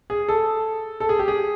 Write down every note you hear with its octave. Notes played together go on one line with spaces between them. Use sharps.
G#4
A4
A4
G#4
G4
G#4